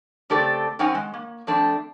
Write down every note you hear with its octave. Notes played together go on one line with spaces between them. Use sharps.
C#3 A3 C4 G4 A4 D5
F#2 C4 C#4 D#4 F#5 G#5
G#3
A#3
F3 A3 C4 D4